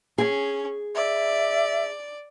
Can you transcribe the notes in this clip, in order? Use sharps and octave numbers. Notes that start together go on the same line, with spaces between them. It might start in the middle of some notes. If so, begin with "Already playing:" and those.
C#4 G#4
D5 E5